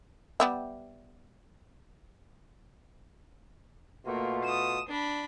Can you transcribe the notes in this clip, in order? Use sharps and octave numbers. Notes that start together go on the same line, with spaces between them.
G3 B3 E5
B2 A3 A#3 F4
D#6 E7
D4 B5